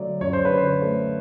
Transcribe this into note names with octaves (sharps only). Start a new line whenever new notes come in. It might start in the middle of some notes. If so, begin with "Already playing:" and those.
Already playing: D3 F#3 A3 D5
F#2 C#5
C5
B4
D3
C5
A3